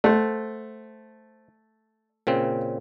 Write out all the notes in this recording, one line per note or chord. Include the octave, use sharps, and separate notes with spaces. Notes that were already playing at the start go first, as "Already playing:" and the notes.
A3 C5 F#5
A#2 C#3 C4